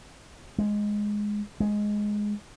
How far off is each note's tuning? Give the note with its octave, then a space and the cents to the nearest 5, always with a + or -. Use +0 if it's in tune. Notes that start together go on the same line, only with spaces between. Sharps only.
G#3 +0
G#3 +5